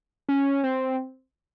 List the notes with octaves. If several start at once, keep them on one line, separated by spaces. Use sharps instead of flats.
C#4
C4